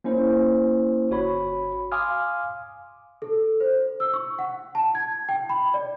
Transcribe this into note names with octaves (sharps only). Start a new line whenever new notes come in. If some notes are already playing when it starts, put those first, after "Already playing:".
A#3 C#4 E4 C5
G1 F#4 C#5 B5
F5 G#5 C6 D6 D#6 F6
A4
C5
E6
C#6
F#5
A5
G#6
G5
B5
D5